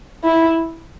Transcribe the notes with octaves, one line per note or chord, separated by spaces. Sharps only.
E4